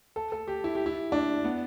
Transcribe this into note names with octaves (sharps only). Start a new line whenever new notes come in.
A4
A4
G4
E4
G4
E4
D4
B3